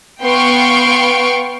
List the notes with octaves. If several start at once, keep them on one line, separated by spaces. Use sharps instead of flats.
B3 F5 G5 C6 C#6 D7